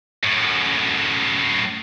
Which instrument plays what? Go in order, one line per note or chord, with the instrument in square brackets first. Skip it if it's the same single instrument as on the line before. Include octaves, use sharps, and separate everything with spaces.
[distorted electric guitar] F#2 A2